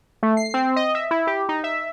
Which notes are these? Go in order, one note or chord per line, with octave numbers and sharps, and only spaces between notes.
A3
C7
C4
D#5
E5
E4
G4
D#4
E5